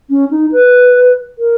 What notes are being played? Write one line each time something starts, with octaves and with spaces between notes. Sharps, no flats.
C#4
D#4
B4
A#4